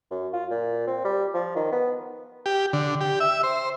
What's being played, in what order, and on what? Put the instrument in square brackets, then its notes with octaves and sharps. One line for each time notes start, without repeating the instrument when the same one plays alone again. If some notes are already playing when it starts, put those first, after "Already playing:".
[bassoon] F#2
F4
A#2
C4
G3
F3
D#3
B3
[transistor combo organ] G4
D3
G4
E5
C5